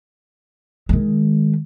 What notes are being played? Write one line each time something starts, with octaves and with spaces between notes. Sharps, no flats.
D#3 G#3